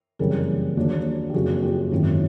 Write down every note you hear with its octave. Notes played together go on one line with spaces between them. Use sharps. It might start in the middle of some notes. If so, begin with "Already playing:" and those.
F#1 F2 C#3 E3 G3 G#4 A#4
D#2 C#3 F#3 A#3 D4
G4
F#1 F2 C#3 F#4 G#4
F4 G4
G#1 F#2 D#3 E4